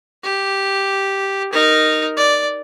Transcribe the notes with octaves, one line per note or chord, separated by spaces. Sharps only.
G4
D#4 A#4
D5